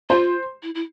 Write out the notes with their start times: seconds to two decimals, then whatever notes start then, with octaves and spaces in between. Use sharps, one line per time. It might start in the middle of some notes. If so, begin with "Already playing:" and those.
0.10 F4 C5
0.63 E4
0.75 E4